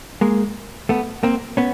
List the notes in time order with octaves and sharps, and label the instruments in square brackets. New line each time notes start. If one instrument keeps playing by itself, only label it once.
[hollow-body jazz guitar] G#3 A#3
A3 B3
A#3 C4
B3 C#4